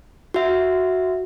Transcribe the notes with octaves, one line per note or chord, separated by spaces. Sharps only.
F#4 E5